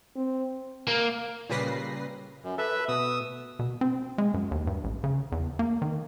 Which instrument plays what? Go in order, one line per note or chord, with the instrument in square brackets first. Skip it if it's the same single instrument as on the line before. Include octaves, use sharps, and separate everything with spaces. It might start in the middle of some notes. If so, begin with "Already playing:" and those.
[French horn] C4
[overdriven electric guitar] A#3
[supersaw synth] A#2 C#3 G3 B4 A#6 C7
[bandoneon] F#2
[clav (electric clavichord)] A4 [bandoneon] B4 E5
[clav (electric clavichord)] B2 [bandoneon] D#6 E6
[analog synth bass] B2
C4
G#3
F#2
D#2
G2
A1
C#3
E2
A#3
D#3